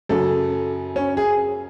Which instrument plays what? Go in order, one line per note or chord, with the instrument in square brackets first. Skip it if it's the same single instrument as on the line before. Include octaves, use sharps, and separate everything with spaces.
[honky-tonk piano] F#2 C#3 F#3 [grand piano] A4
[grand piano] C#4
G#4